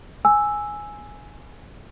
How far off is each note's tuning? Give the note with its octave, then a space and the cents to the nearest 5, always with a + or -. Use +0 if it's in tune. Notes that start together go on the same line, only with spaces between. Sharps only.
G#5 +0 E6 +0